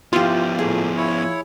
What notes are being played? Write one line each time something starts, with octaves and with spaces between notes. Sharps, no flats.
F3 B3 E4 F4 G4
A2 A3 A#3 G#4
E4 C#5